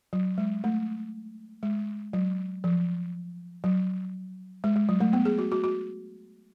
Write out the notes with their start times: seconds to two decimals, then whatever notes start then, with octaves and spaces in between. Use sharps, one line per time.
0.13 F#3
0.38 G#3
0.64 A3
1.63 G#3
2.13 F#3
2.64 F3
3.64 F#3
4.64 G#3
4.76 G#3
4.89 F#3
5.00 A3
5.13 B3
5.25 G#4
5.38 F#4
5.52 F#4
5.64 F#4